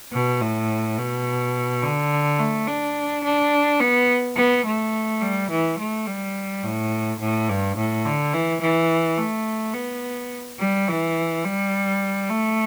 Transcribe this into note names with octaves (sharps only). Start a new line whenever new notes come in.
B2
A2
B2
D3
A3
D4
D4
B3
B3
A3
G3
E3
A3
G3
A2
A2
G2
A2
D3
E3
E3
A3
B3
G3
E3
G3
A3